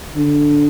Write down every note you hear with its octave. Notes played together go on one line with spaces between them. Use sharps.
D3